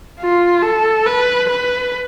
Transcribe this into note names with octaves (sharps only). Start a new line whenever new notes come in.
F4
A4
B4
B4